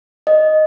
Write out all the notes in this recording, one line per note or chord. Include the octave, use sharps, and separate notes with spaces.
D#5